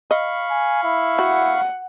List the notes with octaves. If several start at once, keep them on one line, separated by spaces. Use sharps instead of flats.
D#5 F5 B5 C#6
G#5
E4
F#4 F#5